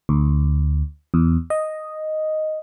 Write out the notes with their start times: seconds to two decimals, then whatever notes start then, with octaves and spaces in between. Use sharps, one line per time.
0.09 D2
1.14 E2
1.50 D#5